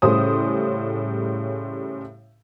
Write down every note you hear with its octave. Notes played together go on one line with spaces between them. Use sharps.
A2 C#3 G3 C#4 C5 D#6